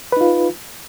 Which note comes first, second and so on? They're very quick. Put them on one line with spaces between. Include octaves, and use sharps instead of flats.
B4 D#4 F4